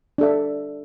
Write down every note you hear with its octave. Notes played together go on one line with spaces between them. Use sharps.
D4 A4 E5